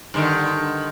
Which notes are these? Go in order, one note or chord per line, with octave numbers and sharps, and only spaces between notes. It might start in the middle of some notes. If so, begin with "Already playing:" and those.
G2 D3 D#3